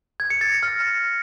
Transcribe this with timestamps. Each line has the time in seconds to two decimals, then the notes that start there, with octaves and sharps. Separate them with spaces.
0.20 G#6
0.30 C#7
0.41 A6
0.52 A#6
0.63 F6